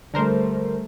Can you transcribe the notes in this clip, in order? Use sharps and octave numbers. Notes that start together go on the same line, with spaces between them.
D3 G3 A3 A#4 C5